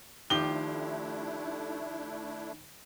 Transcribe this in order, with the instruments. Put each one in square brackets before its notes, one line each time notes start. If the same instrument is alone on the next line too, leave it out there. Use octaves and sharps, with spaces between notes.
[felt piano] D#3 [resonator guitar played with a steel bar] F3 G4 [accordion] A3 D4 E4 [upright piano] G7